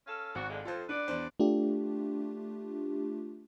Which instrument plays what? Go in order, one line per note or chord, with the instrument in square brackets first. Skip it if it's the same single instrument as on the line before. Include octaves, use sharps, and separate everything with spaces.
[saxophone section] C#4 A4 F5
[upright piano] G#1 [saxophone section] F#4
[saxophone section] D3 F3 G#3
[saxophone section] F2 [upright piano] F4 A4 C5
[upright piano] D4 [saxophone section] B4 D5 F#5
[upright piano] E2 D4 C5
[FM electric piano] A3 D4 F4 G4